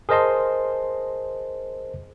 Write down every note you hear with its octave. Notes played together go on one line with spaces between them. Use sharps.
G#4 A#4 C5 D#5 A5 C6